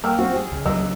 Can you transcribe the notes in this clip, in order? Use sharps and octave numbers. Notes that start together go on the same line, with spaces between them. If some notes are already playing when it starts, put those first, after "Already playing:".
A#3 G5 E6 F6
C4 F#4
G#4
C#2
C#2 F#3 D#5 E6
G#3